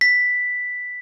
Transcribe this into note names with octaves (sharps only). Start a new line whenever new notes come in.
B6